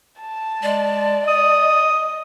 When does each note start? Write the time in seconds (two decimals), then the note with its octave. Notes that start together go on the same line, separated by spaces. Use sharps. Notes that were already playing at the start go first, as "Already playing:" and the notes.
0.20 A5
0.63 G#3 D5
1.28 D#5 D#6